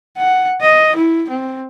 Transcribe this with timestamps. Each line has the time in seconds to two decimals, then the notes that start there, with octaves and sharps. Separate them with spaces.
0.18 F#5
0.61 D#5
0.96 E4
1.29 C4